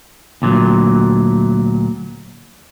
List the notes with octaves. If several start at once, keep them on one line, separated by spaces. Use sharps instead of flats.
D2 A#2 E3 F#3